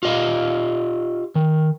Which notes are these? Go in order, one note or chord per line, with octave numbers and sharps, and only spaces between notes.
F4 G4 D#5 F5
D#3